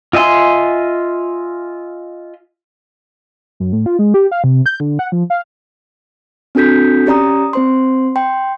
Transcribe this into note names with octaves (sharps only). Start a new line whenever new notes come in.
F4 D#5 E5 G#5 C6
F#2
A2
F4
G#3
G4
F5
C3
G6
D3
F#5
F3
F5
C4 D4 F#4 A4 G6 B6
C#4 G4 D5 A#5 D#6
C4 C5 C6
G5 C6